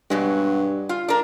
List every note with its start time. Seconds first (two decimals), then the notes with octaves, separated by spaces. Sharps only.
0.10 G2 B2 F#3 G#3
0.89 F4
1.08 D4 A#4